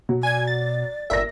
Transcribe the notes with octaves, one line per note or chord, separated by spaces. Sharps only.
B2 F#3
D5 G#5 G#6
A6
G1 A#4 D5 E5 A#6